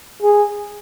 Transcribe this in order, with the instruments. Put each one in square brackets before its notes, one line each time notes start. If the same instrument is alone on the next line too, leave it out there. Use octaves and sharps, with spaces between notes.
[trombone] G#4